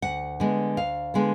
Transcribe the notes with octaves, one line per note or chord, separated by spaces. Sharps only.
D2 F#5
D3 G#3 B3
D2 F5
D3 G#3 B3